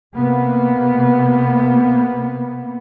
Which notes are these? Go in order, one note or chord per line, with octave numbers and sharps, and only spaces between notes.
C3 A#3 B3